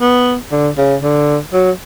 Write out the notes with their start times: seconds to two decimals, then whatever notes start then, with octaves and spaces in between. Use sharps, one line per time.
0.01 B3
0.51 D3
0.78 C#3
1.03 D3
1.53 F#3